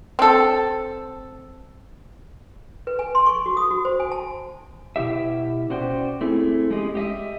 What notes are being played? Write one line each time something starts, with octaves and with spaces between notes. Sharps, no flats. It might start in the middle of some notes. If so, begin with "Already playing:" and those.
C4 A4
B4
G#5
C6
C#6
F#4
D#6
F#4
C5
G#5
A5
B2 E4 G4 E5
C#4 F#4 C5 D5 G5
A3 C4 E4 G#4
G#3 C#4 G4 G#4 D#5
G4 D#5 E5